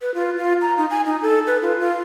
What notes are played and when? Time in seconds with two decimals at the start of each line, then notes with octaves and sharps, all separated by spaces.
0.02 B4
0.14 F4
0.37 F4
0.61 A#5
0.77 D#4
0.91 G#5
1.06 D#4
1.22 A4
1.47 B4
1.62 F4
1.80 F4